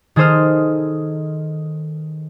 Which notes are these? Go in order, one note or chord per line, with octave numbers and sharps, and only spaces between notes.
D#3 G#4 A4 C5 D#6 F6